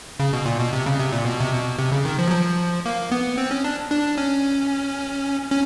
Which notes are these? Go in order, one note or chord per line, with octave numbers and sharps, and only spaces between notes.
C#3
B2
A#2
B2
C3
C#3
C3
A#2
B2
C3
B2
C3
C#3
D#3
F3
F#3
F3
A#3
B3
C4
C#4
D4
D4
C#4
C#4